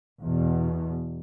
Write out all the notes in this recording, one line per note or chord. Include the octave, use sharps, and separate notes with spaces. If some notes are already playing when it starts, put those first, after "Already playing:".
E2 B2